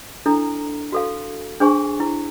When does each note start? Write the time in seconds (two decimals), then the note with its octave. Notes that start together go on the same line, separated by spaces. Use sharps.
0.26 D4 E4 A4 A#5
0.92 F#4 A4 F5
1.60 D4 G#4 C5 G#5 C#6
2.00 E4